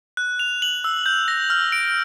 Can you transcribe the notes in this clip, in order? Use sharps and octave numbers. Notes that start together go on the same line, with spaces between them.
F#6
F7
F#7
E6
G6
A#6
F6
D7